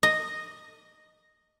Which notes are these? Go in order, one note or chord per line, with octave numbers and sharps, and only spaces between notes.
D#5